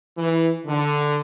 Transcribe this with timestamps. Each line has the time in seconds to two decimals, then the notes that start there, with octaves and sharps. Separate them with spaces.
0.17 E3
0.67 D3